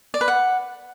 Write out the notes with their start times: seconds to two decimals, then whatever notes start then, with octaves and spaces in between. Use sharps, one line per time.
0.14 D5
0.21 B4
0.28 F#5